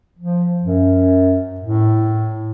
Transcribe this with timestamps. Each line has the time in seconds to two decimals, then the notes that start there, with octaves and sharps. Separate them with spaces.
0.19 F3
0.63 F#2
1.61 A2